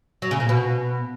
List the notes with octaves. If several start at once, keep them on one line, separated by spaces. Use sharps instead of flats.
F#3
C#3
A#2
B2